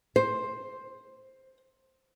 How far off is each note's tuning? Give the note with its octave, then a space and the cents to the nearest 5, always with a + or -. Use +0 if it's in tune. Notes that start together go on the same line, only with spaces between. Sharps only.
C5 +10